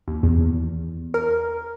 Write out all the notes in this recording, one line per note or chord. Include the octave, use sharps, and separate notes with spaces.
D#2
E2
A#4